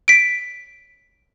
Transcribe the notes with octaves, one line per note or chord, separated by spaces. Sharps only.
B6 D7